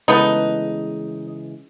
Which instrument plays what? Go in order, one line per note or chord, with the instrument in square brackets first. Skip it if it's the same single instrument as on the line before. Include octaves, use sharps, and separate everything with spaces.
[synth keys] C#3 E3 G#3 [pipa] A3 B3 D#4